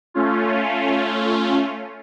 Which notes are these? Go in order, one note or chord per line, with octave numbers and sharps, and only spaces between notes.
A3 C#4 F4